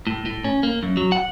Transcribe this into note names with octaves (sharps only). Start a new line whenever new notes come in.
A2
A2
C#4
A#3
F#2
F#3
F#5